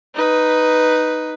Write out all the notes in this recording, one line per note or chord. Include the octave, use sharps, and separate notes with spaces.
D#4 B4